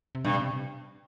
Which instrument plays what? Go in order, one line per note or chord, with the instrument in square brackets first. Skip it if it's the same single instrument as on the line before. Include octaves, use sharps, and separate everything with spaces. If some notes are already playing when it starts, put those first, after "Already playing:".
[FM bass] C3
[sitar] G2 [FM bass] B2
[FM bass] C3